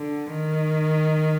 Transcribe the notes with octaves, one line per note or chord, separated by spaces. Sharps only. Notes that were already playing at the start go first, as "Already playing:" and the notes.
Already playing: D3
D#3